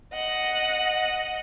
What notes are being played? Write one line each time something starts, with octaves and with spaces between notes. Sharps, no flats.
D#5 F#5